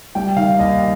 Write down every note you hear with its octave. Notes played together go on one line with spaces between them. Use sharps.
G3 G5
D#3 F5
D#2 D#5